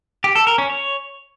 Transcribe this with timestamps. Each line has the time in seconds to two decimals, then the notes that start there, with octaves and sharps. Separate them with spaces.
0.24 G4
0.35 A4
0.47 A#4
0.58 C#4
0.70 C#5